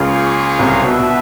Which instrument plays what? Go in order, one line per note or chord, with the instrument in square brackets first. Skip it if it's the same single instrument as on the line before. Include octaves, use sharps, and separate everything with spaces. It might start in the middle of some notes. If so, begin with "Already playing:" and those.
Already playing: [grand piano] C#2 C#3 [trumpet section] A#3 C#4 F4 G#4 C#5
[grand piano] C2 C3
[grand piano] B2 [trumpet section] D4 F#4 B4 E5
[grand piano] B2